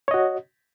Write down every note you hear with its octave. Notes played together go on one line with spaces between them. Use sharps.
F#4 C#5 D#5